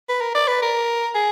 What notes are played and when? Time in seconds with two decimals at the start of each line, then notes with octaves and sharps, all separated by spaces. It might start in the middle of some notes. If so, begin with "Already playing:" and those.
0.09 B4
0.21 A#4
0.35 D5
0.48 B4
0.62 A#4
1.15 G#4